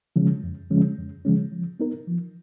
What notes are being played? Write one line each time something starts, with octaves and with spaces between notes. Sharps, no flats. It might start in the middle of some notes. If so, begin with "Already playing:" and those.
C#3 F3 G#3 C#4
F2
C#3 F3 G#3 C#4
F2
C#3 F3 G#3 C#4
F3
B3 D#4 A#4
F3